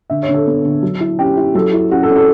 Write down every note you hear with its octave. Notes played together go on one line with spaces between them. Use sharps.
D3 E5
C#5
D3
A4
B3
D3
F#3
E4
C#4 G4
E4
F#3 A4
E4
C#4 F#4
A4
C#4
A4